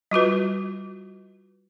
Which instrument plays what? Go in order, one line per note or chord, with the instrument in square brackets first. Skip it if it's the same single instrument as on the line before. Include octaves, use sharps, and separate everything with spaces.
[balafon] G3 F4 F#4 B4